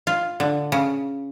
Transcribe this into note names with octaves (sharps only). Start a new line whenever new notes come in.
F4
D3
C#3